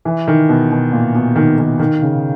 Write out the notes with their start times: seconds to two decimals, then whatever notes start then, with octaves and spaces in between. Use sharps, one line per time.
0.05 E3
0.28 D#3
0.49 B2
0.71 B2
0.92 A#2
1.15 B2
1.36 D#3
1.58 D#3
1.79 D#3
2.02 C#3